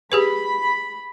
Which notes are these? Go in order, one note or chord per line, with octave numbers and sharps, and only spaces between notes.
G4 G#4 B4 B5